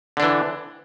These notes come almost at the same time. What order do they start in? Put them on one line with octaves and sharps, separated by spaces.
D3 D4 E3